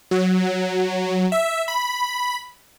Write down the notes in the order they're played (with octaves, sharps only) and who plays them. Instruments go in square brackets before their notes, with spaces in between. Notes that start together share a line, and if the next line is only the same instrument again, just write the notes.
[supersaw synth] F#3
E5
B5